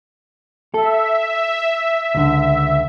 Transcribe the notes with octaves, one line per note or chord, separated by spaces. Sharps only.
A4 E5
C#2 D3